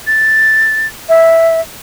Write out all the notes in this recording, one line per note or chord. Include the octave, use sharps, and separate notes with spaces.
A6
E5